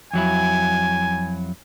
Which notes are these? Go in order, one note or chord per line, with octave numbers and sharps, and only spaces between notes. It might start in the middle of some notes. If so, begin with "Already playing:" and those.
F2 F#3 E4 G#5